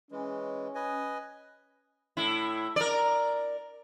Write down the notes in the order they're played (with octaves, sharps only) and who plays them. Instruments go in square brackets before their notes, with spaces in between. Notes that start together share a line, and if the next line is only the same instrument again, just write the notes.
[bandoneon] E3 G#3 [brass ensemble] C#4
[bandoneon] B4 D#5 G#5
[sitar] A2 E4
A#4 D5